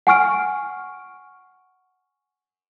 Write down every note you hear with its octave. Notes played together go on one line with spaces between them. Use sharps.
F#5 G#5 C#6 F6 D7